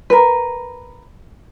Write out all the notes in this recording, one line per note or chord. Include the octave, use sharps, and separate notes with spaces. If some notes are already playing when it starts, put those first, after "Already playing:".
A#4 B4